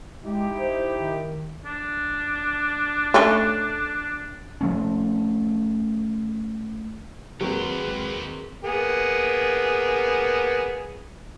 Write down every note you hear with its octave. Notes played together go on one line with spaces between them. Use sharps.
G#3 D#4 E4 G4
C5
D#3
D4
A3 C#4 D#4
F3 A3 C#4
D#3 F#3 G#3 A#3 C4 G4 B4
A#3 B3 G#4